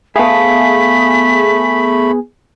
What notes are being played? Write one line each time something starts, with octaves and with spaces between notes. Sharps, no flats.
A3 B3 G#4 E5 F5 A5 B5 B6